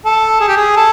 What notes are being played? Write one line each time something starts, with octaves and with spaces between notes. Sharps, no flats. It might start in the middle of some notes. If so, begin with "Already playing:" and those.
A4
G#4
G4
G#4
A4